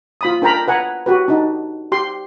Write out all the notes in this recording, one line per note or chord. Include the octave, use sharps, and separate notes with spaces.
F4 B5 D#6
D4 A#4 G5 A#5 B5
B4 F#5 G#5 A#5
F#4 G4 B4
D4 D#4
G4 C6